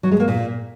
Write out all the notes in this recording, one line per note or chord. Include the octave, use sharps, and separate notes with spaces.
F#3
G#3
A#3
A#2